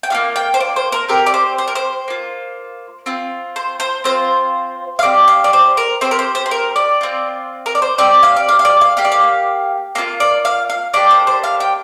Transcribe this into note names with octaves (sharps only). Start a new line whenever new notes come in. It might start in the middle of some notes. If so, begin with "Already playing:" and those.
G5
A#3 D4 F4 F5
G5
C5
D5
C5
A#4
C4 G4 A#4
D5
C5
C5
A#4
C5
A#3 F4
C4 F4
C5
C5
C4 F4 C5
F5
C4 G4 D5
F5
D5
C5
A#4
C4 G4 C5
A#4
C5
C5
C5
A#4
D5
C4 F4
A#4
D5
C5
C4 G4 D5
F5
D5
F5
F5
D5
F5
A#3 G4 F5
D5
F5
A#3 D4 F4 F5
D5
F5
F5
A#3 D4 G4 D5
C5
C5
F5
G5